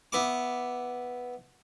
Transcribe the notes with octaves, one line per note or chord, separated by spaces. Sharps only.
B3 E4 D6